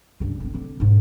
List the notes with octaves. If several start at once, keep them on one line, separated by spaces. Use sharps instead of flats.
C#2 G2
D3 C4
D3 C4
G#2 D3